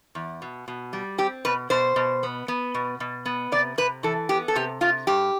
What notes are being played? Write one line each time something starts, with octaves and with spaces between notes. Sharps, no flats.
E2
B2
B2
G3
C4 G4
B2 B4
B2 C5
B2
B3
B3
B2
B2
B3
C3 D5
C3 B4
E3 A4
B3 G4
A4
C3 G4
C3 F4
G2 G4